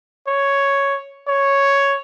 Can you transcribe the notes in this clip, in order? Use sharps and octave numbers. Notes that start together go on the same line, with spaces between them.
C#5
C#5